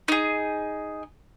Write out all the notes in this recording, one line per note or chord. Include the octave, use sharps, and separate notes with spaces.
D#4 G#4